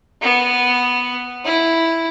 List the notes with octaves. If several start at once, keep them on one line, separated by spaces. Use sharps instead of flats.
B3
E4